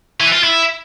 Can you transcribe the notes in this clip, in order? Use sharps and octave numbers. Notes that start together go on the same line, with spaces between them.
E3
F4
E4